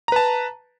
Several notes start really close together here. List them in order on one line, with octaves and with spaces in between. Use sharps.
A#5 B4 A5